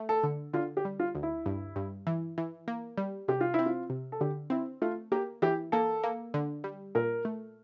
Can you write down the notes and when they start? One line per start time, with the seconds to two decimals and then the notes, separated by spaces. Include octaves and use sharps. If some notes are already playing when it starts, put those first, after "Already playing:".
Already playing: A3
0.09 A4
0.24 D3
0.54 D3 F4
0.77 G4
0.85 G3
0.99 F4
1.15 D2
1.23 E4
1.46 G2
1.76 G2
2.07 E3
2.38 E3
2.68 A#3
2.98 G3
3.28 C3 G4
3.41 F4
3.54 C4 E4
3.66 F4
3.90 C3
4.12 A4
4.21 D3 G4
4.50 C4 E4
4.82 A3 F4
5.12 A#3 G4
5.42 E3 G4
5.72 A#3 A4
6.04 A#3
6.34 D3
6.64 G3
6.95 A#2 A#4
7.25 A3